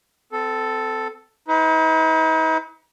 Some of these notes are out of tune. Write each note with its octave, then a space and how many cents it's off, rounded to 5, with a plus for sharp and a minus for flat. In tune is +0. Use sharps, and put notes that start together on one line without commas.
C4 -35 A4 +0
D#4 +45 B4 +30